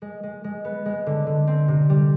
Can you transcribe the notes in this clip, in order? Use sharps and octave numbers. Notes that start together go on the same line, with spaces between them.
G#3
G#3
G#3
B3
G#3
D3
D3
C4
C3
G3